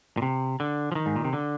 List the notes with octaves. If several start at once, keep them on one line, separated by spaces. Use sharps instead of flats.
A#2
C3
D3
F3
D#3
G#2
A#2
C3
D3